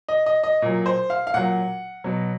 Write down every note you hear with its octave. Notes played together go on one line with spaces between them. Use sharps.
D#5
D#5
D#5
A#2 F#3
C5
F5
F5
A#2 F#3 F#5
B2 F#3